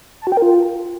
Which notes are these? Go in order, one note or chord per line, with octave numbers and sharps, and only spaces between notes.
A5
F#4
G5
A#4
F4